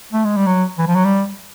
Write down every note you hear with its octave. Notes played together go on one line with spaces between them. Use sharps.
A3
G#3
G3
F#3
E3
F3
F#3
G3